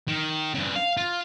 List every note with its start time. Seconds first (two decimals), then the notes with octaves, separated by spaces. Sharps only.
0.08 D#3
0.54 G2 C#3
0.76 F5
0.97 F4